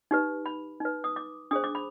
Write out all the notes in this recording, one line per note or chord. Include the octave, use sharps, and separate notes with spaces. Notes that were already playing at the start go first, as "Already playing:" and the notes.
D#4 G4 B4
B5
D#4 B4
D#6
D6
D4 G#4 C5 D#6
D6
B5